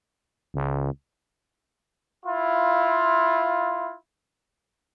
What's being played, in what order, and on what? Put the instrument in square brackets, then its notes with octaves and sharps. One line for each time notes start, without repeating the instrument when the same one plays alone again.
[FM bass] C#2
[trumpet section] E4 F4